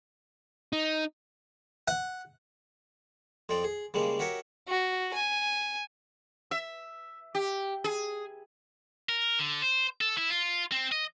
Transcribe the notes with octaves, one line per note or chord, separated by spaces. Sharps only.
D#4
F#5
F2 F3 C4 D5
G#4
C#3 G3 G#3 A#3
F#4 G4 A#4 C#5 E5
F#4
G#5
E5
G4
G#4
A#4
D3
C5
A4
E4
F4
C4
D#5